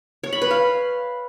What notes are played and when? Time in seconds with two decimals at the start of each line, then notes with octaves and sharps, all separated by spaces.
0.24 C#5
0.33 B5
0.42 B4
0.51 F5